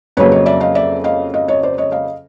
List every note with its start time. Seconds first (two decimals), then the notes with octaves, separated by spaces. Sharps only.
0.17 F2 C#3 F#3 A#3 B4 C#5
0.31 C#5 D#5
0.46 D5 E5
0.60 D#5 F5
0.75 D5 E5
1.04 D#5 F5
1.34 D#5 F5
1.48 C#5 D#5
1.63 C5 D5
1.78 C#5 D#5
1.92 D#5 F5